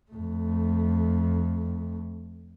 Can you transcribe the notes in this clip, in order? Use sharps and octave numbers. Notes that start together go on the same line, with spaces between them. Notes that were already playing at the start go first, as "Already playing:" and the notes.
F2 A3